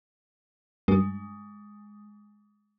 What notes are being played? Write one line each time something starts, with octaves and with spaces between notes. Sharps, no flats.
G2 G#3